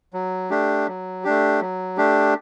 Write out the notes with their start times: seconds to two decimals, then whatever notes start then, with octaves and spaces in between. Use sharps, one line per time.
0.13 F#3
0.50 A3 D4 G4
0.87 F#3
1.24 A3 D4 G4
1.61 F#3
1.97 A3 D4 G4